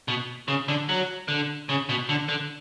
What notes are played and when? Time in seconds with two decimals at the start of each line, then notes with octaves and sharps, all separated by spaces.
0.08 B2
0.48 C#3
0.68 D3
0.89 F#3
1.28 D3
1.69 C#3
1.89 B2
2.09 D3
2.29 D3